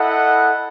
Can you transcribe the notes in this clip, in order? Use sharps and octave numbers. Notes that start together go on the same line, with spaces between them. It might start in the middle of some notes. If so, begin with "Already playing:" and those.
Already playing: E4 A4 D#5 F#5